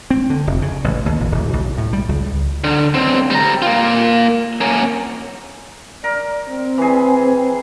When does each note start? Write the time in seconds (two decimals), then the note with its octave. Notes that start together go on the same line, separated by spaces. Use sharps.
0.11 C4
0.30 D3
0.47 F1
0.62 C#3
0.84 A1
1.06 D#2
1.20 A#1
1.32 D1
1.53 B1
1.78 A2
1.93 G3
2.09 C#2
2.64 D3
2.94 B1 C4
3.30 G3 A#5
3.62 A#3 F4
4.61 A#3 C#4
6.04 A#4 D5
6.48 C4
6.78 E3 G#4